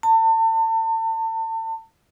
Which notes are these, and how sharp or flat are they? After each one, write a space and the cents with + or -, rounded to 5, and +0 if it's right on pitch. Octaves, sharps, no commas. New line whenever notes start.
A5 +35